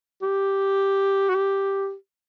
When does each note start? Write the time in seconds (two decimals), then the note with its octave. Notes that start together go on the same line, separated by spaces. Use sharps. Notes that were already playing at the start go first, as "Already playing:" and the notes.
0.22 G4
1.29 F#4
1.35 G4